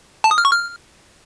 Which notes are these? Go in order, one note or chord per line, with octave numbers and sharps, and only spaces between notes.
A5
D#6
F6
C#6
F6